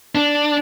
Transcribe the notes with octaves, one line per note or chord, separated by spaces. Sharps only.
D4